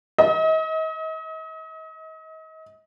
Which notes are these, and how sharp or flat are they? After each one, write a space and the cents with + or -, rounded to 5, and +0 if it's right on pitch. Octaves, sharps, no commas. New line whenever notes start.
D#5 +35